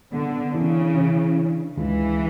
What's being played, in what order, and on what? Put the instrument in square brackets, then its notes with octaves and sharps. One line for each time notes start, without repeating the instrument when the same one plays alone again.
[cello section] D3 [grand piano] B3
[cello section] C#3 [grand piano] E3
[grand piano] E3
D4
[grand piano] C#2 [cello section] E3